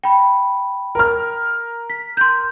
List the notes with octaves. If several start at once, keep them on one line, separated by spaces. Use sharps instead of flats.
G5 B5
A#4 F6
B6
C6 G6